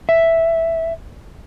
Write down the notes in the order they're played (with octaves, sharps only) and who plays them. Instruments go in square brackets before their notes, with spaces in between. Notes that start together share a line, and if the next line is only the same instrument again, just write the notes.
[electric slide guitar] E5